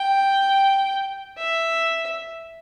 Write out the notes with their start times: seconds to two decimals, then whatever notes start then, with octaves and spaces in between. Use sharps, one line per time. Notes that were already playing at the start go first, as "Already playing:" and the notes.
Already playing: G5
1.38 E5